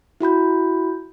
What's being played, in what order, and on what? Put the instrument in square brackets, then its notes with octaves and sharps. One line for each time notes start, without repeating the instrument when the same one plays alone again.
[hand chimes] E4 F#4 B5 G6